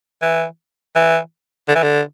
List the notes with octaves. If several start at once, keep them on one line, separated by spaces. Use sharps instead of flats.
E3
E3
D3
E3
D3